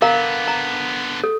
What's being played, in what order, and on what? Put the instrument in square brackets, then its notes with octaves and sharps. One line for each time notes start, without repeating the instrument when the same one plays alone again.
[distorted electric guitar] D3 B3 [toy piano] A#4 F5 A#5
[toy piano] A#5
A4